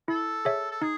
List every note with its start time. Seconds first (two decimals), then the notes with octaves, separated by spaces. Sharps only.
0.08 E4 A4
0.45 G#4 C#5 E5
0.71 A4
0.82 D#4 G#4